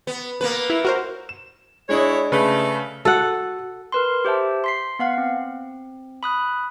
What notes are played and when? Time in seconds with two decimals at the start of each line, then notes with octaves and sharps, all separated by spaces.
0.07 B3
0.41 A#3 B3 B4
0.70 E4
0.85 F#4 A#4 C5
1.29 E7
1.89 G#3 D4 E4 C#5 D#5
2.32 C#3 A3 B4
3.05 F#4 A4 F#5
3.92 A#4 B4 C6
4.25 G4 C5 E5 A5
4.64 C6 B6 C7
4.99 B3 F5 F#5
5.18 C4
6.23 B5 D#6 F#6